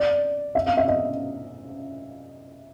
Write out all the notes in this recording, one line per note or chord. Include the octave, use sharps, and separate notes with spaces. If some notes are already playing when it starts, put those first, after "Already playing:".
Already playing: D5
E5
F5
E5
D#5